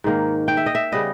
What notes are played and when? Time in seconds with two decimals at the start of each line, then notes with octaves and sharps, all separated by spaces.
0.04 G#2 D#3 A#3
0.48 G5
0.57 E5
0.66 D#5
0.75 E5
0.92 C#3 G3 B3 D#5